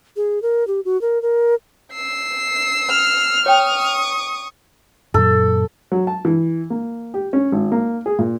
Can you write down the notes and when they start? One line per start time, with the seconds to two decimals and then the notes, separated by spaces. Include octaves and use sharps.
0.16 G#4
0.42 A#4
0.68 G4
0.85 F#4
1.01 A#4
1.22 A#4
1.93 E6 C7
2.90 F6
3.46 C#5 G5 C#6 D#6
5.14 F#2 A#2 F#3 A4
5.92 F#3
6.07 A5
6.25 E3
6.70 A#3
7.14 G4
7.33 C#4
7.52 G#1
7.72 A#3
8.06 G#4
8.19 A#2